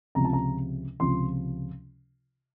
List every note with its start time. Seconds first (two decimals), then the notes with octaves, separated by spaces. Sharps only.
0.15 C#2 C3 F3 A#5
0.25 A5
0.33 A#5
1.00 C#2 C3 F3 C6